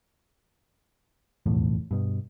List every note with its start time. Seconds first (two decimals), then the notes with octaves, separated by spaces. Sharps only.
1.46 F1 B1 E2 A2
1.91 G2 B2